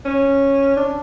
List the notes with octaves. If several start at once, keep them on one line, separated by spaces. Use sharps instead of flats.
C#4
D4